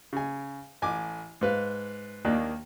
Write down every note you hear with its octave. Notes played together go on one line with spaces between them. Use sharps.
C#3 G#5
A1 G#5 D6
G#2 B4 F5
D#2 D#3 A#3 D4 F#6